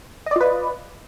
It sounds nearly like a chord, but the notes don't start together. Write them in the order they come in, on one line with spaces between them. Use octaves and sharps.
D#5 D5 F4 B4